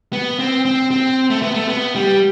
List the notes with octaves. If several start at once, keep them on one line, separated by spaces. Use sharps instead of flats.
B3
C4
C4
C4
A3
B3
A3
B3
G3